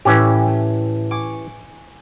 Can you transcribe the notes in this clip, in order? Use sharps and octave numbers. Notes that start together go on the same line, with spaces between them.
A2 E3 C#4 G4
A3
G#5 C#6 D6